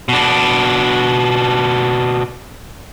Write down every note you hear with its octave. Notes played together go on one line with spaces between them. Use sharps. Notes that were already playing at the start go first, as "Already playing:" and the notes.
B2 D4